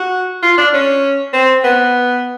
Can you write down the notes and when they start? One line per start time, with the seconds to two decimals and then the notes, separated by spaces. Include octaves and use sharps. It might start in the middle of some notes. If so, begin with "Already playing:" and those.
Already playing: F#4
0.42 F4
0.58 D4
0.73 C#4
1.33 C4
1.64 B3